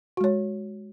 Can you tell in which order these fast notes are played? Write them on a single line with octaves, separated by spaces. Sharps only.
F#4 G#3 C#5